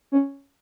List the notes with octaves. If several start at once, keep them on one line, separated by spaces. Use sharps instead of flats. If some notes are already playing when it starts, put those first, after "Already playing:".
C#4